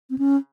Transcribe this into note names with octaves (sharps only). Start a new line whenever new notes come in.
C4
C#4